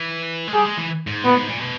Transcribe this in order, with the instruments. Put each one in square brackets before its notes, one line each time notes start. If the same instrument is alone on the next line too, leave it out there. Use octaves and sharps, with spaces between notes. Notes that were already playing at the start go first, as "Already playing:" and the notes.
Already playing: [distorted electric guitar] E3
G#3
[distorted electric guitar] G3 [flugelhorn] G#4
[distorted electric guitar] G#3
E3
G#2
[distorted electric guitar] A#2 [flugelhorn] B3
[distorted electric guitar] G#2
A#2
B2